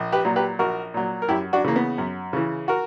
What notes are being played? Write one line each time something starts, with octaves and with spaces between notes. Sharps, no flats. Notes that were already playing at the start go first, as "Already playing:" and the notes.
Already playing: A#1
G4 B4
A#2 F#3
G4 B4
A#1 F#4 A#4
A#2 F#3
A#4
F#2 E4 G4
D4 F#4
C#3 E3 A#3
B3
F#2
C#3 E3
F#4 A#4